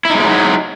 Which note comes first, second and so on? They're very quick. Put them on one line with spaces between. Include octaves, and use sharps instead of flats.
E4 D#4 G#3 A#3 F#3